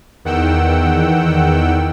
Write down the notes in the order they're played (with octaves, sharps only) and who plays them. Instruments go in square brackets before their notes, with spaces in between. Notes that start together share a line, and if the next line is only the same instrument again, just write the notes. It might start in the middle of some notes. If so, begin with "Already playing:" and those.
[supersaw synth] E2 D#3 F#5 G5 E6